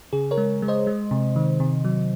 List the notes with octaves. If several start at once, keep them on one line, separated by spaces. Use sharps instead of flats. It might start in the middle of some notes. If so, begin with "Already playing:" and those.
C#3 G#4
A#4 C#5
G#3
G#3
C5 D#5
G#3
C3
D#3
C3
F#3